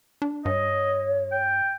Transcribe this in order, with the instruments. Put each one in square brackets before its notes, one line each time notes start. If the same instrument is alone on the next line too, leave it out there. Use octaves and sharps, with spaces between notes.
[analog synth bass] D4
[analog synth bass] G2 [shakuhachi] C#5 [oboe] D#5
[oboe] G5